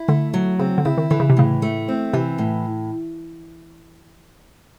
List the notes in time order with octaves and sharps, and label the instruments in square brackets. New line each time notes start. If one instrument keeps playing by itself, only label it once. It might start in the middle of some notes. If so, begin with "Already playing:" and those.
Already playing: [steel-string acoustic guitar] E4
[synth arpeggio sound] D3 [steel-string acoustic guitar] A3
[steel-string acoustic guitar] F#3
[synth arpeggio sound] C#3 [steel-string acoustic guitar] C4
[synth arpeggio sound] D3
[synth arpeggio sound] C#3 [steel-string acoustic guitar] E4
[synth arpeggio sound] D#3
[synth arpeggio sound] D3 [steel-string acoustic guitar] E3
[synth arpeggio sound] C#3
C3
[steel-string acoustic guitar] A2 [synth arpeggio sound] C#3
[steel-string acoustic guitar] A3
C4
[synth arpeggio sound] C3 [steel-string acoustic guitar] E3
[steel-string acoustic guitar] A2